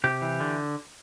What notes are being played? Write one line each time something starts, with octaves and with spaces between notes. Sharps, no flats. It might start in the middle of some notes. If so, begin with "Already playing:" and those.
C3 G4
E3
D3